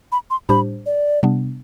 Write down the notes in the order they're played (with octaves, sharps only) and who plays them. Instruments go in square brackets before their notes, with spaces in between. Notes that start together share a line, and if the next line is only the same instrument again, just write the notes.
[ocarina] B5
C6
[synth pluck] A2 G3 D4 G4 C5 [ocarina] B5
[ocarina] D5
[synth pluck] C3 G3 B3 D4